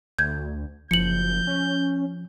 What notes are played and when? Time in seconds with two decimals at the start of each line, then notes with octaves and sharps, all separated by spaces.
0.19 D2 G6 G#6
0.91 F#1 F3 G6 C#7 F#7
1.47 C#4